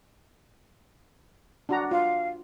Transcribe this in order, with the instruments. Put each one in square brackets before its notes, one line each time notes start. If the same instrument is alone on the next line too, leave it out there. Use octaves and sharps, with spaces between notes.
[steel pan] D4 F#4 A#5
[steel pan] F4 [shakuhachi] F5